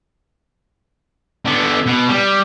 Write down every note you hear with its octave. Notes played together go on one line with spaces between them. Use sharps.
D3 B3
B2
G3